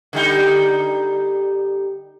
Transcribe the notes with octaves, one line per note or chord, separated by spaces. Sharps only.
D3 G3 D#4